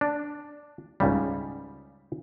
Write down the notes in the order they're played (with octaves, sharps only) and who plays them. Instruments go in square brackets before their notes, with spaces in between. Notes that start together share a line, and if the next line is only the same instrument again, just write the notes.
[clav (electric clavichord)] D4
C#2 G#2 C#3 G3